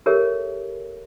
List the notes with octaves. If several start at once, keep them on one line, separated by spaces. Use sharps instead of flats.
G4 A4 A#4 C#5 E5